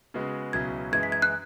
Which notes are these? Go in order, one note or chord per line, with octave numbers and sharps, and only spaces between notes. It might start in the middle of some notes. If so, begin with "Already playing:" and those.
C#3 G#3 B3 F#4
C#2 B2 F#3 C#4 E4 G#6
F#2 E3 G#3 E4 G#6
B6
G#6
F#6